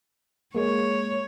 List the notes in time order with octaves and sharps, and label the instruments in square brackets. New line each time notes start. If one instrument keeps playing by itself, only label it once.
[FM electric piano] G#3 A#3 [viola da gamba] C#5